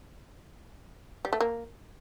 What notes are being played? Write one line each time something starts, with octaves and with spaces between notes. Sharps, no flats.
G3
A3
A#3